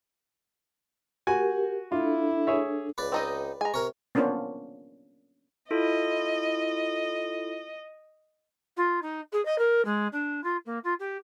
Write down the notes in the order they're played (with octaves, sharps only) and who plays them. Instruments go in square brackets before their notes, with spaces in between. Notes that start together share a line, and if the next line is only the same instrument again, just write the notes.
[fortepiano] F#4 G#5 [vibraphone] G4 A#4
[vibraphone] D4 A4 [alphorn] E4 [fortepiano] F4
[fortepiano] G#4 C#5 E5
[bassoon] C#2 [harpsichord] B4 D5
[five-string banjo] C4 D#4 D#5
[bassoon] G#3 [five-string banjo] G#5 A#5
[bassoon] C3 [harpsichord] A#4 C#5
[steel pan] A#3 B3 C#4 D4 F4 C5
[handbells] E4 F4 A4 [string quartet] D#5
[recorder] F4
D#4
G#4
D#5
A#4
G#3
D4
F4
A#3
F4
G4